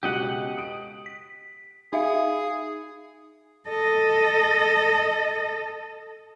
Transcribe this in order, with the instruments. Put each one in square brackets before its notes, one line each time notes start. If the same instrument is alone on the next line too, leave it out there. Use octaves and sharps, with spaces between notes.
[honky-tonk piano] C#2 B2 F#6 [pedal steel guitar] G4 D#5 F#5
[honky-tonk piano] D#6 D7
[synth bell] B6
[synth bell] D#4 E5 F5 [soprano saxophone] G#4
[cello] A4 D#5